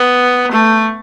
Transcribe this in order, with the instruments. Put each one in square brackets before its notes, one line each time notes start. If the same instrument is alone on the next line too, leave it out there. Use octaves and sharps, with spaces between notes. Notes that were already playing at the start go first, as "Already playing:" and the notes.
Already playing: [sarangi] B3
A3